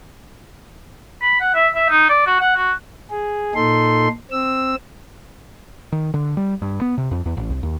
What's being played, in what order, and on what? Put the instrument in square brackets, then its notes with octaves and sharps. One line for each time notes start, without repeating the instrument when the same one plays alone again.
[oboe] B5
F#5
E5
E5
D#4
D5
F#4
F#5
F#4
[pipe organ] G#4
A#2 D#4 A4 C6
C4 E6
[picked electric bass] D#3
D3
G3
G2
B3
C3
F2
E2
A1
C2
D#2